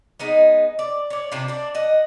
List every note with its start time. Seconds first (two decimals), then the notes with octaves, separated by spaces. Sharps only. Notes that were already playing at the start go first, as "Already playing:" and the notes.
0.19 G#3 B3 D#4
0.79 D5
1.10 C#5 D5
1.32 C3 D4 E4 F4
1.48 D4 D5
1.75 D#5 F#5